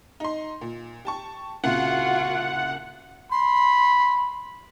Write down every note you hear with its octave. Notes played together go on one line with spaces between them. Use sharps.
D#4 C6
A#2
G4 A5 C#6
C2 A#2 C#3 F4 F#4 F#5
B5 C6